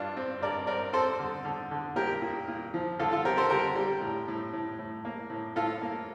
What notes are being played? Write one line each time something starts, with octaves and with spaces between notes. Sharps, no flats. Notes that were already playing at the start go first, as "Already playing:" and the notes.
Already playing: G2 D4 F4
C4
G2 A#4 D5
C4 A#4 D5
C4 A4 C5
D3
D3
D3
A#2 G4 A#4
A#2
A#2
F3
D3 F4 A4
F4 A4
C4 G4 A#4
A4 C5
D3 G4 A#4
G3
A2
A2
A2
A2
A#3
A2
A2 F4 A4
A#3